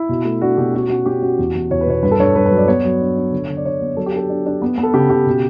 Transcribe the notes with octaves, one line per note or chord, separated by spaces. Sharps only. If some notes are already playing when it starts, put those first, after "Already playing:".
Already playing: E4
B2
A3
D4 F#4
B2 G4
C#4 F#4
C#4 F#4
C#4 G4
C#4 F#4
E2
E2
E2 C#5
B4
B2 C#5
G2 B4
A4
G2 C#5
G2 B4
B4
F#3
D5
B3 C#5
F#3
D4
D4
D3
D3
D5
D3 C#5
B3
F#3 A4
G4
D4 A4
D4
D4
B3
B3
A4
C#3 G4
C#3 G4
B2